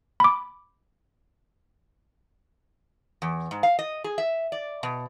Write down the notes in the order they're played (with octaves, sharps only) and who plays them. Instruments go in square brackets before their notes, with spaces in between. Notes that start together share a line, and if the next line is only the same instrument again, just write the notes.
[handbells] B5 D6
[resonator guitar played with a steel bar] E2
G#2
F5
D#5
G#4
E5
D5
B2